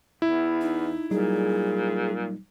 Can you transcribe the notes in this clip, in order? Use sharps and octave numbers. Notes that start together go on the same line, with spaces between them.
E2 E4
D#4
A#2 F#3 G3 D#4 G#4